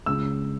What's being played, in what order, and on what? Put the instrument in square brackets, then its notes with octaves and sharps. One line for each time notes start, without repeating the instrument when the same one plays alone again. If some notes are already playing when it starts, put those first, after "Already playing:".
[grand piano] C#2 E6